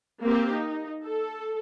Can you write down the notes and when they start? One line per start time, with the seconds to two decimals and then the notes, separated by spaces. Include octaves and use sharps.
0.23 A#3 C4 G4
0.54 D#4
1.04 A4